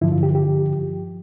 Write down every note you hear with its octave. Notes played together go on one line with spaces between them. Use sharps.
G2 D3 F3 E4
F4
G4
G4